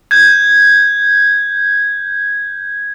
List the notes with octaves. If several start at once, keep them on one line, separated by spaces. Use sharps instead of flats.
G6 G#6